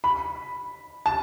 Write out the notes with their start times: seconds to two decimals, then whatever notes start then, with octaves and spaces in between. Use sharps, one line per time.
0.04 B5
1.06 A5